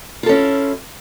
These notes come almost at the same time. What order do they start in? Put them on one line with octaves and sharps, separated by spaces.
F4 A4 C#4 E4